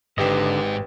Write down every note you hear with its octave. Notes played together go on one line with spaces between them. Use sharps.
G#1 G#2 D3 G4 B4 D#5 G5